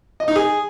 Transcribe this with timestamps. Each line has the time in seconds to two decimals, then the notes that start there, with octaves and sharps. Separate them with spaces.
0.20 D#5
0.28 D#4
0.36 G#4